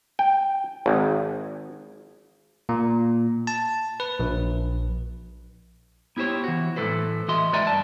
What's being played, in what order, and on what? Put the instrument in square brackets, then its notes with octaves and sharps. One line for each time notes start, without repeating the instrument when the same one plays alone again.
[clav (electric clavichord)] G5
G#1
[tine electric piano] A#2
A5
B4
A#1
[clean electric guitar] B3 E4 G4 C5 C#5
E3 F#4
A2 E3 A#3 A4 B4 C5
E3 F#4 D#5 E5 C6
G#3 B4 D5 E5 G#5 A#5
G2 A5